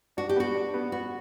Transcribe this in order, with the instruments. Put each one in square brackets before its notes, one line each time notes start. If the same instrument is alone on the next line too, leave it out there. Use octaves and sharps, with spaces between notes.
[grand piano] D4 [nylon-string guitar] F#4
[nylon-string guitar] G4
[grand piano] B3 [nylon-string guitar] F#4
[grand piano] D4
B3
[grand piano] B3 [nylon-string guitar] F#4